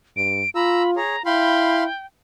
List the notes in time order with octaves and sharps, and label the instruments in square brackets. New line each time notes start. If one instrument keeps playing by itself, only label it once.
[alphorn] G2 [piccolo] D7
[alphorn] F4 [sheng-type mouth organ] A#5 E6 [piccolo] B5
[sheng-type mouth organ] G#4 C#5 [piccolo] A#5
[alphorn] E4 [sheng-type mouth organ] F5 B5 C6 [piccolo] G5